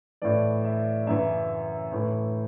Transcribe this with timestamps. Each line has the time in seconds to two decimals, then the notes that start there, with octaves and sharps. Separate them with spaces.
0.22 A2 E3 D5
0.64 E5
1.07 F#2 C#3 E3 E5
1.92 A2 E3